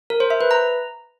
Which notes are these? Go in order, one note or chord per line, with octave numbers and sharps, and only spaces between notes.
A#4
C5
E5
B4
A#5